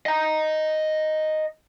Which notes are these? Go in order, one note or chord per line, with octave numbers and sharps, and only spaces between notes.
D#5 A#5